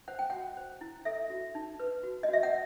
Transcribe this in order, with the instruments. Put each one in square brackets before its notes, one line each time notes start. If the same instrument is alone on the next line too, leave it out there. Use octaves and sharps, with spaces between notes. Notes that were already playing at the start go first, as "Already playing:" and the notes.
[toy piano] C5 F#5
G5
F#4 F#5
C5
E4
A4 E5
F#4
D#4
B4
F#4
D#5
F#4 E5
F#5